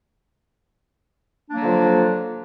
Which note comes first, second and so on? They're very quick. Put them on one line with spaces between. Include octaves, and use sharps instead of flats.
D4 A#3 F#3 D3 F3